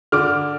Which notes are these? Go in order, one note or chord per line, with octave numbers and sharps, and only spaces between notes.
D3 D6 F6